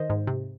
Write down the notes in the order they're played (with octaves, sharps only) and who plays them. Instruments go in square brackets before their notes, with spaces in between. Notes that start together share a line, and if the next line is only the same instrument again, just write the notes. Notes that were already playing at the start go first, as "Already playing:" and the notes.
Already playing: [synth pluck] D#3 C5 D#5
G#2
C3